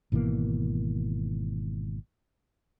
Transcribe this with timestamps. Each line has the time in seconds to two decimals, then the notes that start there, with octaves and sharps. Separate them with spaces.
0.12 G#1 B2 E3 A#3